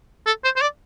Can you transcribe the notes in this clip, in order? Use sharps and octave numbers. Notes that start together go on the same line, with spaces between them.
A4
C5
C5
D5